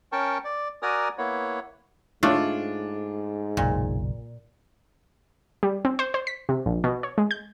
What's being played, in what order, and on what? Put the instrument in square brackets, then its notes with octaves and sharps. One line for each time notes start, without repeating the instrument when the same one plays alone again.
[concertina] C#4 A#4 G5 A5 C#6
D5
F#4 A#4 D5 G#5 A#5 D#6
A#3 B3 E4 C#5
[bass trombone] G#2 [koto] A3 [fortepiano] D4 F4 C#5
[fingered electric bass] F#1 B1 [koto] A#2
[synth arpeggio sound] G3
C4
C5
C5
B6
C3
A#1
B2
C#5
G#3
G6